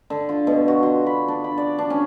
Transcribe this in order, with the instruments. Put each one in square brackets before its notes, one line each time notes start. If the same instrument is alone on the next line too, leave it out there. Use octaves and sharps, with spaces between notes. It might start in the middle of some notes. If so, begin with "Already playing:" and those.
[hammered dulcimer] D3
F4
B2
F#4
C6
B5
D4
B5
D5
D4
C#4